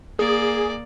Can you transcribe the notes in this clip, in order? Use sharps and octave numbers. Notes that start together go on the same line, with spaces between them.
A#3 G#4 D5